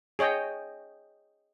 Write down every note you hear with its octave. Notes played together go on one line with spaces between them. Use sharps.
G#4 C#5 D#5 G5